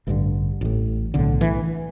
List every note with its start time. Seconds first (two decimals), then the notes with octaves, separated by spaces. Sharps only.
0.07 A1 G2 D3 E3
0.61 A1 A2
1.14 B1 A2 D3
1.41 E3